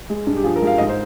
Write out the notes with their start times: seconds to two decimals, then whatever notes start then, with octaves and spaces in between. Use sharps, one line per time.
0.10 G#3
0.27 G2
0.37 G4
0.44 F3 G#4
0.56 A#4
0.62 G#3
0.67 F5
0.78 G#2 D#5
0.89 C5